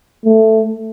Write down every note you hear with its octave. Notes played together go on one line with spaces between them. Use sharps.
A3